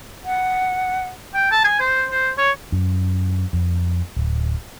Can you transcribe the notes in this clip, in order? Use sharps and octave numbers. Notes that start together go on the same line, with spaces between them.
F#5
G5
A5
G#5
C5
C5
C#5
F#2
F2
D1